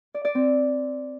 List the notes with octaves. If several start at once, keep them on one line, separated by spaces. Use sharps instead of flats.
D5
D5
C4